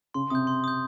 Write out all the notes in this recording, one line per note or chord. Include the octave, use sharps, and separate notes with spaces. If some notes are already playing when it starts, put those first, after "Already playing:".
C#3 C6
C3 D#6 G6
C6
D#6 G6